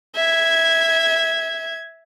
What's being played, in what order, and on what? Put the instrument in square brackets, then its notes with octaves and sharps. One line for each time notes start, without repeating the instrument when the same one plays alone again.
[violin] E5 G#6